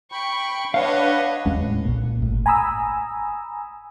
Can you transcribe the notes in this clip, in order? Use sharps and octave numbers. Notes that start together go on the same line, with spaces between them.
G5 B5 C#6
D4 B4 C#5 D#5 F5 F#5
D#2 G#3 C#4
A2
B1 A#2
G1 A2
G#5 A#5 B5 D#6 E6